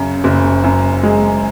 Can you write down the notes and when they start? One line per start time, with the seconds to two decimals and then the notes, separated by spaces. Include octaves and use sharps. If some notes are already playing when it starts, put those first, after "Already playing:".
Already playing: F#2 C#3
0.24 F#1
0.64 F#2
1.03 G#3